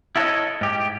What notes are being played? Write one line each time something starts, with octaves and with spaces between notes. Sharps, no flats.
E4 F4 A4 A#4 C#5 D#5
G#2 G4